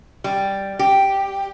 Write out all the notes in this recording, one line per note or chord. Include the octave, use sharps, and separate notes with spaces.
G3
G4